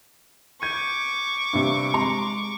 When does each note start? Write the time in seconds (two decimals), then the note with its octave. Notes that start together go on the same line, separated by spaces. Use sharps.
0.62 C#6 D6 G6 G#6 D#7
1.53 G2 C3
1.94 G#3 A#5 C6